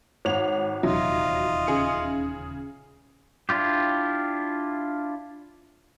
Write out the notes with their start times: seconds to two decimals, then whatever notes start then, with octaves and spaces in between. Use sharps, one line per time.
0.25 G#1 C#5 F#5 F7
0.83 D#1 E2 C3 F#3 D#4 F4 D#5 E5
1.67 C#3 G#4 C#7
3.49 D4 E4 F4 G4